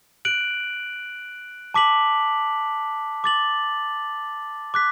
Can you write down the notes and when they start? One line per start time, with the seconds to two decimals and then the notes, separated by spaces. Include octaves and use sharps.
0.25 F#6 D7 F#7
1.74 A5 D6 B6 F#7
3.24 D6 A6 F#7
4.74 D6 F#6 B6